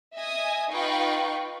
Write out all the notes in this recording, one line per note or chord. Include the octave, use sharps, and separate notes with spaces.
D#5 E5 G#5 D#6
D#4 F4 B4 F5 G5 C#6